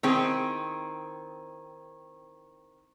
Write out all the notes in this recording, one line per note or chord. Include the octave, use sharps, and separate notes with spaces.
D#3 C4 E4 G#4